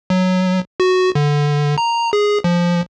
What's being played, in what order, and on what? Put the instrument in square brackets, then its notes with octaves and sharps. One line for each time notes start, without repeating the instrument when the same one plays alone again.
[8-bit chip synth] F#3
F#4
D3
A#5
G#4
F3